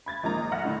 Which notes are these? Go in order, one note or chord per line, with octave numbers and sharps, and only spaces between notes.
B5 G#6 A6
G#1 F3 A#3 D#4 A#5
B1 E5 F#5 F6 A#6
A2 D3 E4